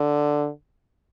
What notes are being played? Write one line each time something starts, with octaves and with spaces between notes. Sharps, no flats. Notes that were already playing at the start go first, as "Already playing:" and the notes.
Already playing: D3